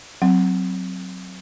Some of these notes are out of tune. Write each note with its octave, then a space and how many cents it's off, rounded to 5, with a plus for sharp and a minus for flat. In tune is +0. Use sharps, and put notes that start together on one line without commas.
F#3 +0 C4 +0